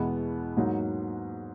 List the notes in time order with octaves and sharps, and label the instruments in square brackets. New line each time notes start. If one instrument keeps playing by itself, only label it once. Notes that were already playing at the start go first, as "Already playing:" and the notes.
Already playing: [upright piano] E2 B2 G#3 B3 E4
G#2 F#3 A#3 D#4